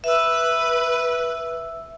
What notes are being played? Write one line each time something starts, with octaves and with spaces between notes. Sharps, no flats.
B4 E5 E6